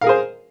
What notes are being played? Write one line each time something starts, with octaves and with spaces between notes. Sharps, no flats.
G#4 A#4 C5 F5